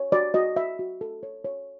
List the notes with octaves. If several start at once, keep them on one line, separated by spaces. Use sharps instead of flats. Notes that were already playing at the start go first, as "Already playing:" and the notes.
Already playing: C#5
F#4 D5
F#4 D#5
F#4 E5
F#4
A4
C#5
C#5